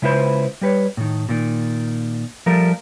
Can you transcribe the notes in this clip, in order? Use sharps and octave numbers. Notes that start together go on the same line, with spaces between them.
C#3 G#3 E4 F4 B4 C5
G3 G4 B4 C#5
A2 D#3
A#2 D#3
F3 G3 A3 A#4